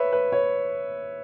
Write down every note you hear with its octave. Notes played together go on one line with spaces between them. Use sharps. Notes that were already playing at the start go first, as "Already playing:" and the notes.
Already playing: B4 C#5 E5
B4
C#5